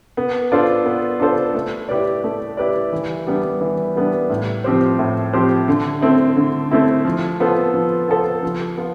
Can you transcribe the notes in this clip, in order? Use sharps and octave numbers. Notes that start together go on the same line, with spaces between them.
B3
D4 F4 A4 C5
B3
D4 F4 A4 C5
A3
E4 G4 B4 D5
A3
E4 G4 B4 D5
E3
G3 B3 D4
E3
G3 B3 D4
A2
F3 C4 G4 C5
A2
F3 C4 G4 C5
D3
A3 C4 E4
D3
A3 C4 E4
F3
B3 F4 A4 C5
F3
B3 F4 A4 C5
F3
B3 F4